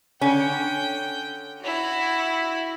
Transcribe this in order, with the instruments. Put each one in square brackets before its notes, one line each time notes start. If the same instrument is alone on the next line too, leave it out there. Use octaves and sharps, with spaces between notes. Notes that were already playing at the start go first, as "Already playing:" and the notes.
[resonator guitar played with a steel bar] D3 C#4 [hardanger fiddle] G5
[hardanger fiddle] E4 F#4